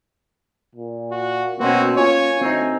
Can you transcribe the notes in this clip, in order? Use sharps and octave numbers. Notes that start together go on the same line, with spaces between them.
A#2
F#4
B2 A#3 C4 C#4 F#4
F4 C#5 G#5
D2 C4 D#4